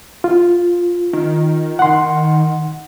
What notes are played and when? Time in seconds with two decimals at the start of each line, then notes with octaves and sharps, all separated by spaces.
0.24 F4
1.13 D#3
1.79 F#5 C6